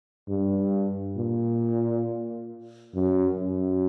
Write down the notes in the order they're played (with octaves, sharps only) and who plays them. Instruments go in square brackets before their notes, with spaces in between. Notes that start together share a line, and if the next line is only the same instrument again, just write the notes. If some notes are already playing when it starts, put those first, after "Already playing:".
[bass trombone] G2
A#2
F#2
F#2